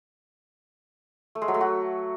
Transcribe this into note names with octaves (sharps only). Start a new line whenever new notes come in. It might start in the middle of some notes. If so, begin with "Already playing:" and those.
A3
G#3
F#3
A3
F#4